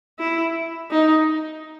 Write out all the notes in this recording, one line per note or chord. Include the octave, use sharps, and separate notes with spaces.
E4
D#4